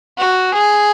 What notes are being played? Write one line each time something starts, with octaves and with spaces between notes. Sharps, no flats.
F#4
G#4